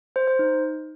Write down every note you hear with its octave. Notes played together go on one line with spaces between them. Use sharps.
C5
C5
D#4